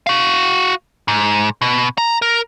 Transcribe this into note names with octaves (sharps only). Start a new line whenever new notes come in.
F#4 F5
G#2
B2
A#5
A#4